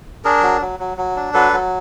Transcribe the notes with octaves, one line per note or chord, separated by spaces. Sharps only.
D4 G#4 A#4
F#3
F#3
F#3
F#3
D4
F#3 A4 B4
F#3